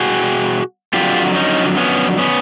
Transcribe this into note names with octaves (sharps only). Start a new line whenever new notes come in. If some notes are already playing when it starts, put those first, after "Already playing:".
Already playing: B2 G3 F#4 G#4
F2 D3 F#3 F4 G4
C#4 D#4
B3 C#4
B3 C#4